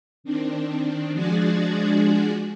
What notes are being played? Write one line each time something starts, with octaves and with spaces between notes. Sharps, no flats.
D#3 C4 D4
F3 G#3 D4 F#4 G#4 D5